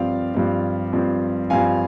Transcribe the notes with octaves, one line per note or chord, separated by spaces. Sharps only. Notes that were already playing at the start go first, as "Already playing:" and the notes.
Already playing: G2 F3 C4 D5 F5
G2 F3 C4
G2 F3 C4
G2 F3 C4 F5 G#5